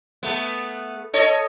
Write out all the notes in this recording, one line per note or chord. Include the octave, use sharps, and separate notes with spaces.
A3 B3
A4 C#5 D#5